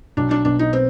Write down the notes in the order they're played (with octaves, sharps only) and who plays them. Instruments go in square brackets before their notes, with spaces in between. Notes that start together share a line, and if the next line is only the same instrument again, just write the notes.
[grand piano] B1 [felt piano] D4
[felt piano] D4
[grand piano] B2 [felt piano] D4
[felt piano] D#4
[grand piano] B3 [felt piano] C4